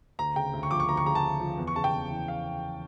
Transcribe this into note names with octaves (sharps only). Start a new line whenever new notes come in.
D2 A#5
C#3 G5
D2
C#6
F3 D6
C#6
D2 A#5
C#6
C#3 A#5
A5
D2
F3
E2
C#6
C#3 A5
G5
E2
E3
F5